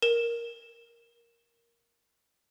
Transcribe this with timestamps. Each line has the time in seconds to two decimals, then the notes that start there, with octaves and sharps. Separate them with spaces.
0.02 A#4 E7